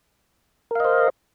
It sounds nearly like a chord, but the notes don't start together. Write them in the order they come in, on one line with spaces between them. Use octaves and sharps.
A#4 F5 D#5 C5